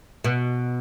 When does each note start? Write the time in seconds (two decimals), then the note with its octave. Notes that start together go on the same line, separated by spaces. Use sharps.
0.24 B2